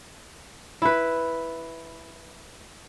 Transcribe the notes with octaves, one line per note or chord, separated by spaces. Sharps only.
E4 B4